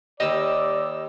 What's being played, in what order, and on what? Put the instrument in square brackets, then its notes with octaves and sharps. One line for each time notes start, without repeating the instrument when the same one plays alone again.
[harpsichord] D#2 G3 [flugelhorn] D5 [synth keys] D#5 E6